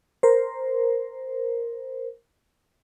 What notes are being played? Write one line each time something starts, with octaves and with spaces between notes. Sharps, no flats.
A#4 C5